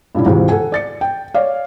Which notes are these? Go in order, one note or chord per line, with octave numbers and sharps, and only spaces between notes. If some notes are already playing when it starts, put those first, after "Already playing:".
G2 A#2 C#3 E4
D#2 G#2 C3 E3 F3 G#3
A4 F#5 G#5
D5 A6 C#7
G5
C#5 D5 F5